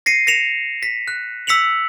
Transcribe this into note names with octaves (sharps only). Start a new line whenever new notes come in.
A#6 C7 C#7 D#7
A#6 C#7 E7 F7
B6
F#6
E6 B6 C#7 F7 F#7